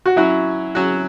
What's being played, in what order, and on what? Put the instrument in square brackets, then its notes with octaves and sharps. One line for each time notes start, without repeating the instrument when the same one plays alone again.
[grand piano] F#4
[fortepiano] F#3 C#4 F#4 [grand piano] E4
[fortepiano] F#3 C#4 F#4